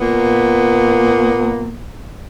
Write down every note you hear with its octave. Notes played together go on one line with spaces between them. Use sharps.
A#2 A#3 B3